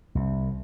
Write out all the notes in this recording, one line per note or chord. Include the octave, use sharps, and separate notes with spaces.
C2